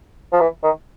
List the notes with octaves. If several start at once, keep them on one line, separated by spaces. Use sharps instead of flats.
F3
E3
D#3